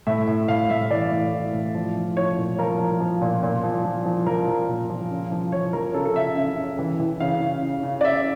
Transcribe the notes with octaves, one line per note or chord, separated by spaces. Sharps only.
A2 E5
A2
A2 F5
A2 E5
E3 D5
A2
E3
A2
F3
F3
F3 C#5
A#2
F3 A#4
F3
F3
A#2
A#2
F3
F3
F3
F3 A#4
F3
A#2
F3
C#3
F3
F3 C#5
F3 A#4
C#3 A4
A4
C#3 E5
C#3 E5
C#3
E3
E3
C#3 F5
C#3
C#3
C#3
D5
C#3 E5